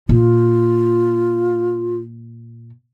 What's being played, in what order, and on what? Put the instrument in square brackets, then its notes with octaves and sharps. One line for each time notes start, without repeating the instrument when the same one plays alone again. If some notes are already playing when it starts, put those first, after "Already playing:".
[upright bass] A#2 [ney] F4